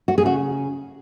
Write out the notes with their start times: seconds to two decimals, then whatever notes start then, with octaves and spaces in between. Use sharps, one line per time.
0.08 F#4
0.18 G#4
0.23 C#3 F#4